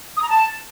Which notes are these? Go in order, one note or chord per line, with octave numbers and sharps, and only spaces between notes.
D#6
A#5
A5